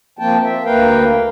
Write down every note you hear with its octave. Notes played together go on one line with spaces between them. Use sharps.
F3 A#3 C4 G5 A5
E5
D2 A#3 A#4 B4 F5 G5